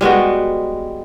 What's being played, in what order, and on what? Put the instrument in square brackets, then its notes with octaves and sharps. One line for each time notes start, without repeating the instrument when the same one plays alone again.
[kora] G3 G#3 B3 F#4